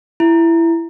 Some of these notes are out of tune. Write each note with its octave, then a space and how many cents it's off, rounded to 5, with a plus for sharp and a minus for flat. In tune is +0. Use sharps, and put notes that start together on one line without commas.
E4 +15